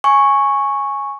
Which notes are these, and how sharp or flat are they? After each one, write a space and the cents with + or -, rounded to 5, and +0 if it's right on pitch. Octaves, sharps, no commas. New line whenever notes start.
G#5 +0 C#6 -5